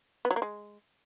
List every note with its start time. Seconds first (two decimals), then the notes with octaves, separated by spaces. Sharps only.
0.25 B3
0.31 F#3
0.36 A#3
0.42 G#3